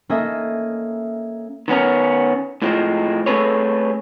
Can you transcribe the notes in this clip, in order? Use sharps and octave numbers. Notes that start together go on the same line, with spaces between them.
A#3 C#4 A4 D#5 E5
D#3 B3 C#4 A#4
A2 F3 G#3 C4
A3 C4 G#4 A4 B4 C#5